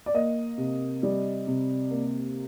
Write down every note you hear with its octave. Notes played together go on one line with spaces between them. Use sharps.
D5
A#3 D#5
C3
G3
C3
A#3